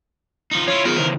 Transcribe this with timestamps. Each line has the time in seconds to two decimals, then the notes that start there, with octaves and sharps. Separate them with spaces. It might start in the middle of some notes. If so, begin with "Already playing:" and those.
0.51 F3 D#4
0.68 E4 F4 C#5
0.85 B3 D#4 F4 G#4 A#4
0.98 C#3 E3 C5